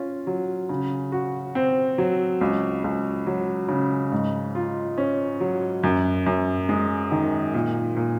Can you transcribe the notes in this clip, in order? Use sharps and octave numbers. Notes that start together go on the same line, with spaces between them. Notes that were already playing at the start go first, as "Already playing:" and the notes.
Already playing: C#4 F4
F#3
C#3
F#4
C4
F#3
C#2
C#2
F#3
C#3
G#2
F4
C#4
F#3
F#2
F#2
G#3
D#3
A#2
A#2